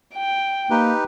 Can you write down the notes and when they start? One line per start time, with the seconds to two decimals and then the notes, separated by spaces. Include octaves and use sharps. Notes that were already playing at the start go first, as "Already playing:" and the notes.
0.14 G5
0.70 A#3 D#4 G4 B4